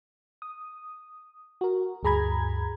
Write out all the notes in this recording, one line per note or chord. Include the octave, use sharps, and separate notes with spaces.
D#6
F#4 A#4
D2 G2 G#4 A#5 B5 G#6